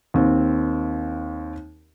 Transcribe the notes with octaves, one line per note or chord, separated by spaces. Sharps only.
D#2 C4